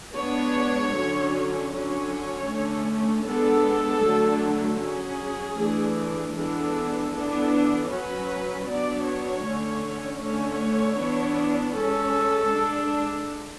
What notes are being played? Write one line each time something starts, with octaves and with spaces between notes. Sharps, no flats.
G#3 B3 D4 C#5
D3 F#3 C#4
D3 F#3 C#4 C#5
D3 A3 C#4
G#3 B3 D4 A4
D3 F#3 A3
F#3 C#4 G#4
E3 A3 D4
E3 G#3 B3 D4 A4
E3 B3 D4
F#3 C#4 B4
F#3 B3 D4 D5
C#5
D3 A3 C#4
D3 A3 C#4 C#5
E3 B3 D4
G#3 C#4 A4
G#3 D4